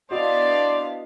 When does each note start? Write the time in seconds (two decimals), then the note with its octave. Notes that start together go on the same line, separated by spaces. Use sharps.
0.11 B3 D4 E4 F#4 C5 D5 D#5 F5